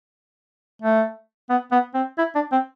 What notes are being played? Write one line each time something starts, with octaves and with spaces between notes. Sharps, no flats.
A3
B3
B3
C4
E4
D4
C4